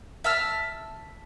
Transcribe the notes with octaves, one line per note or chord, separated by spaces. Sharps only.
E5 A5 E6 F6